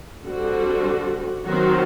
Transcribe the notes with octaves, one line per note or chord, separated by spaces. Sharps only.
D3 G3 C4 F#4
D#3 F#3 C4 F#4